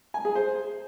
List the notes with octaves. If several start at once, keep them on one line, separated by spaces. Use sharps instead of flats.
G#5
G#4
C5